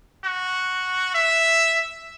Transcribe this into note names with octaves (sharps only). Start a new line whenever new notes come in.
F#4
E5